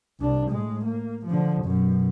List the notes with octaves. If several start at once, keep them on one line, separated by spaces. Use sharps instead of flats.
C2 D4
A2 G#3
A#3
D3 F3
F#2 B2